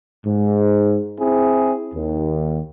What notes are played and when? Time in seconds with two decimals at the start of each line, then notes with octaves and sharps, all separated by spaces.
0.25 G#2
1.18 C4 E4 G#4
1.93 D#2